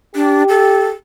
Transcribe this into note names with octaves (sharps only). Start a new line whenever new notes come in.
D4 G4
A4